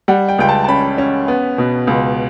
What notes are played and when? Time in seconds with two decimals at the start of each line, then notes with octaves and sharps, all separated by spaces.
0.08 G3 F#5
0.29 G5
0.39 C#2 G5
0.49 A5
0.64 A5
0.68 C#4 B5
0.98 C#4
1.28 B3
1.58 B2
1.87 C#2